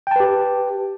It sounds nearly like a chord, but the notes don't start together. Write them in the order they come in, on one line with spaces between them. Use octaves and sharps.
G5 A5 B4 G4